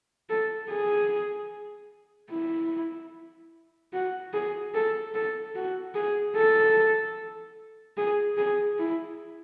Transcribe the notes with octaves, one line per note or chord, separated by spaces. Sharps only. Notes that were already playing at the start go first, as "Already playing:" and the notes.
A4
G#4
E4
F#4
G#4
A4
A4
F#4
G#4
A4
G#4
G#4
E4